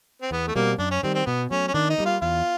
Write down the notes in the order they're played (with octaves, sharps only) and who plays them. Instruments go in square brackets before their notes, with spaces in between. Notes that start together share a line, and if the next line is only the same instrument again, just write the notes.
[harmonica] C4
[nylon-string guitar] E2 [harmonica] B3
[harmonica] A3
[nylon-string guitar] B2 G3 C4 [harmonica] A#3
[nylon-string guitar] F#2 [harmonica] D4
[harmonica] C#4
[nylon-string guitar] D#3 G3 [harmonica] C4
[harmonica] C4
[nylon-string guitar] B2 [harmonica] B3
[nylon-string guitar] F#3 A3 [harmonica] C#4
[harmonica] C#4
[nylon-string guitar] D#3 [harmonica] D4
[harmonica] D#4
[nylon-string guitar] G3 A#3
[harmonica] F4
[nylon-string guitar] E2 [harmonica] F4